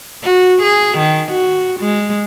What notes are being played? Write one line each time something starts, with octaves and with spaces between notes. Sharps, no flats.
F#4
G#4
D#3
F#4
G#3